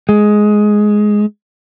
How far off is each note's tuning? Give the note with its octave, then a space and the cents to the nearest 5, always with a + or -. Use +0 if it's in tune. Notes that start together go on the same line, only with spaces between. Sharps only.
G#3 +10